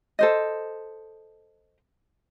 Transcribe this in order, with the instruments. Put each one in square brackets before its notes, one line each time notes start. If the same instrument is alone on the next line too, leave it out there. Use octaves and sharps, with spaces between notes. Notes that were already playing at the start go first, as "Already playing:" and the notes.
[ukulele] A4 C5 D#5